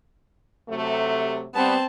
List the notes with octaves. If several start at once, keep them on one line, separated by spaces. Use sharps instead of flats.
C3 F#3 A3
G3 B3 C4 A5